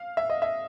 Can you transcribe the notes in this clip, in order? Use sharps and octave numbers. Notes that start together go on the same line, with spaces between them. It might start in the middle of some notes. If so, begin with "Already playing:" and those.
Already playing: F5
E5
D#5
E5